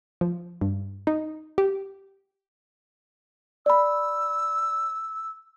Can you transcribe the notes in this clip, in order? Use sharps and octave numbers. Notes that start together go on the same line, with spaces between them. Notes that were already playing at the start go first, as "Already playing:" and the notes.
F3
G2
D#4
G4
D5 B5 E6